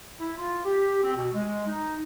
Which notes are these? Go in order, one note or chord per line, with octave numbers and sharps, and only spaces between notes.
E4
F4
G4
C4
B2
G#3
D#4